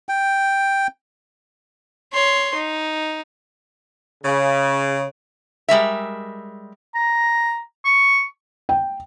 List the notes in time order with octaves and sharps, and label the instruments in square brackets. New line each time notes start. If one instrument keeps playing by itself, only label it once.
[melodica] G5
[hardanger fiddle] C#5 C6
D#4
[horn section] C#3
[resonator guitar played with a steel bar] G3 G#3 A#4 E5
[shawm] A#5
C#6
[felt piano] G5